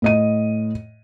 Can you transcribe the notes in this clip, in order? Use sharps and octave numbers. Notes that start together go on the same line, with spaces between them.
A2 D#5 D#7